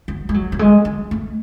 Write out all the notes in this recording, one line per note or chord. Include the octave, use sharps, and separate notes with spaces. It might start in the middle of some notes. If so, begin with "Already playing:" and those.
F#3
G#3
F#3
F#3
G#3
F#3
A3